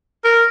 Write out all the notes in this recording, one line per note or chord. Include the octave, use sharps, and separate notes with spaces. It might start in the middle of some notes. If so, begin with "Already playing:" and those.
A#4